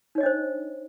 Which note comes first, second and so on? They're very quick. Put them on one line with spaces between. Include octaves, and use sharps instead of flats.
D#4 C#5 D#5 D4 C5